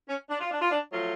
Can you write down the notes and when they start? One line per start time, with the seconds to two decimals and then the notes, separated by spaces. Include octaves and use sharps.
0.08 C#4
0.29 D4
0.40 F4
0.51 D4
0.61 F4
0.71 D4
0.92 F3 F#3 A3 F4